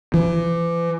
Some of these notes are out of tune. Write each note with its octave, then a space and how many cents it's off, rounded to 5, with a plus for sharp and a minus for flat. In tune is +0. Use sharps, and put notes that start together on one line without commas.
E3 +40